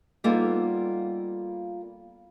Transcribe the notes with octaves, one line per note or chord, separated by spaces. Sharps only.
G3 A#3 B3 D#4 F4 A4